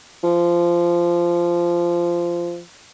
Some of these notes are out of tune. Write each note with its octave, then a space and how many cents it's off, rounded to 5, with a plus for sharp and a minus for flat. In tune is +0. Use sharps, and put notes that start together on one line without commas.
F3 -15